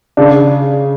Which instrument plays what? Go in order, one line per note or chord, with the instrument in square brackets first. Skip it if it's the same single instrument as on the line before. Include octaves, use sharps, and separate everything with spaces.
[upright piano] C#3 [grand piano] D4